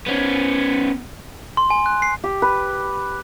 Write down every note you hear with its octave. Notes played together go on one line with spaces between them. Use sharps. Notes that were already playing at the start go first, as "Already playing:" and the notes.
B3 C#4
C6
G#5
F#6
C7
G4
B4